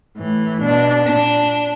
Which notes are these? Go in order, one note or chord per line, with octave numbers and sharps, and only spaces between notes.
A2 E3
B2 D4
A#2 D4